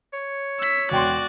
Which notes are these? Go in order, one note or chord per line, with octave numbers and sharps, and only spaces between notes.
C#5
E6 B6
E1 F#4 D5 G5 C6